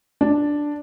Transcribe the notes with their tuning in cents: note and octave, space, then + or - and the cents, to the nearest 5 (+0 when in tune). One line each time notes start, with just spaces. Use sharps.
D4 +0